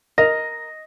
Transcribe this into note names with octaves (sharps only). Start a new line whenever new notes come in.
A#4 D#5 A#6